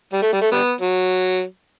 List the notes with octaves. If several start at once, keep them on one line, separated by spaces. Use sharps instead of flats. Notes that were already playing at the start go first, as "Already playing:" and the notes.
G3
A3
G3
A3
G3 B3
F#3